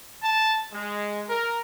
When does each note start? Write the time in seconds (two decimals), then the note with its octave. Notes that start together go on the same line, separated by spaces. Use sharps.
0.22 A5
0.72 G#3
1.27 A#4